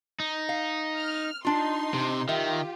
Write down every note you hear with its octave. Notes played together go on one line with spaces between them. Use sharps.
D#4
F5
F6
D4 D#4 F4 C6
C3
D#3 F4 G4 E5